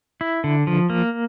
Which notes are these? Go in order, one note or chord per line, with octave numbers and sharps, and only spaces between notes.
E4
D3
F3
A#3